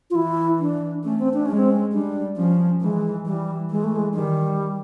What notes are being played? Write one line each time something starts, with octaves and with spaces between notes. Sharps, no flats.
F4
E3 E4
D4
A3 C#4
C4
D4
G#3 C#4
C4
C#4
G3 D4
F3 C#4
E3 G#3
E3 G3
E3 G#3
A3
G#3
D#3 G3